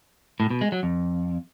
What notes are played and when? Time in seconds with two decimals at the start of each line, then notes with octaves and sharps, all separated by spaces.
0.40 A2
0.50 B2
0.61 G#3
0.72 F#3
0.83 F2